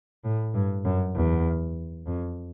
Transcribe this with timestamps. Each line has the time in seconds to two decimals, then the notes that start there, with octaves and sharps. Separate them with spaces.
0.24 A2
0.54 G2
0.84 F#2
1.15 E2
2.07 F2